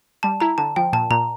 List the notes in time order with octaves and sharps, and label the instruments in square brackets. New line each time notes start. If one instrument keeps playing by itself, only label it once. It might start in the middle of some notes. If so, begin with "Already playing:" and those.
[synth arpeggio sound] G3 [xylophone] A5
[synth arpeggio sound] E4 [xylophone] A#5
[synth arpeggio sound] D3 [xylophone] A5
[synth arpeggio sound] F3 [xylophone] G5
[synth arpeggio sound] A#2 [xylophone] A5
[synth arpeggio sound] A#2 [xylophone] A#5